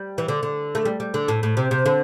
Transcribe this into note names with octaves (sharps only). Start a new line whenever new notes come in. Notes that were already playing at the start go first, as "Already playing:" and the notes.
Already playing: G3
E3
D3
D3
A3
G3
G3
D3
A2
A2
C3
C3
D3